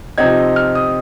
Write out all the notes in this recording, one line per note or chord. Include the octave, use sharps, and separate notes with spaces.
C3 F3 C4 D#4 G#6
F6
D#6